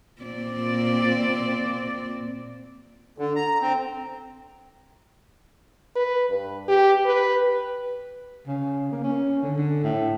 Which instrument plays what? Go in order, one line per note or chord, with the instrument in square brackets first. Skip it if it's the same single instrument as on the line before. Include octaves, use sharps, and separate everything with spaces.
[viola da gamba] A#2 C4 D5
[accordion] D3
A#5
C4
[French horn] B4
G2
G4
B4
[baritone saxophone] C#3
A#3
C#4
D3
D3
A2